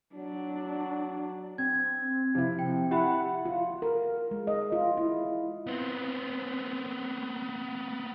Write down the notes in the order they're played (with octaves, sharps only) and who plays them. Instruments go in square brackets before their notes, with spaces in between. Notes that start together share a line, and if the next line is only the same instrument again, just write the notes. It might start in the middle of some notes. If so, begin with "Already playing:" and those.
[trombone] F#3 [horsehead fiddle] D4
[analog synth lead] C4 [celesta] G#6
[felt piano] C3 E4 [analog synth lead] F3
[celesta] G5
[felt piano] E4 [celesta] G4 E5 B5 [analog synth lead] F#5
[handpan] F4
A#4
G#3
D#5
F4
E4
[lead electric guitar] B3 C4